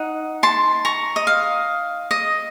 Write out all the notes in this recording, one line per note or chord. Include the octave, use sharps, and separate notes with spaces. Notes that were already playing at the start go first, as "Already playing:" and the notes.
Already playing: D#4 F#5
A5 C6
A#5 C#6
D#5
F5
D#5